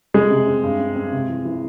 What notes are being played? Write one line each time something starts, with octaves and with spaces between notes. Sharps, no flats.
C3 G#3 G#4
C3
C4
G2
C4
C4
C3
E3
E3